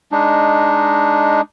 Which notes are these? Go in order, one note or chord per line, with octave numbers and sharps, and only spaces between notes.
G#3 D4 D#4